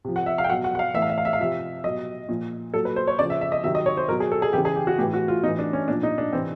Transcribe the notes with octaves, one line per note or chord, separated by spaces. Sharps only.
C3 F3
F#5
E5
F5
G5
B2 F#3 F#5
F#5
F#5
F5
A2 E3 E5
F5
E5
F5
E5
F5
C3 F3 E5
B2 F#3 D#5
A#2 F3
A#2 F#3 A4
B4
C5
C#5
C#3 F3 D5
E5
E5
D#5
C3 D#3 F#3 E5
D#5
C#5
C5
B2 F#3 A#4
G#4
A4
G#4
C#3 E3 G4
G#4
G4
F#4
A2 E3 G4
F#4
F4
A2 E3 D#4
D4
C#4
A#2 F3 D4
D#4
D4
C3 E3 C4